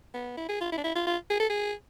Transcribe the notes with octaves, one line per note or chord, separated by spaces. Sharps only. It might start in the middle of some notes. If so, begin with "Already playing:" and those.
B3
E4
G#4
F4
E4
D4
E4
F4
F4
G#4
A4
G#4